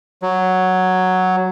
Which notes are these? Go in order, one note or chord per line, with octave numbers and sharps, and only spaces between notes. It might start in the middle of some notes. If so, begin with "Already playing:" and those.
F#3